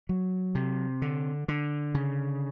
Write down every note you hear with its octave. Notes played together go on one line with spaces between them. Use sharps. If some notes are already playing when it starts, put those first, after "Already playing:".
F#3
C3
D3
D3
C#3